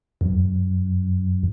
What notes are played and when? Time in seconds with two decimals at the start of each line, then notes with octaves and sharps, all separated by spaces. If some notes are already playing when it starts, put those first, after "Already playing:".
0.21 F#2